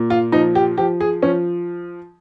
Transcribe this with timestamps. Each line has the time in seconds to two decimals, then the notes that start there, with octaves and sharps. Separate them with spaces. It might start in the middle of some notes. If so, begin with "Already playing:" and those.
Already playing: A#2
0.10 F4
0.32 F3 D#4
0.55 G4
0.77 F3 G4
1.00 G#4
1.22 F3 C#4